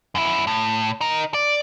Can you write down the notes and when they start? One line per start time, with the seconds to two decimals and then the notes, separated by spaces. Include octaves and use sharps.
0.15 F#2 E4
0.47 A2
1.01 D#4 A#4
1.34 D5